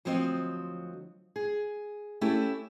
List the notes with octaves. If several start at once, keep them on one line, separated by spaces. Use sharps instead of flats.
D2 F3 F#3 C4 F#4 D#5
G#4
A3 C#4 E4 G4 A4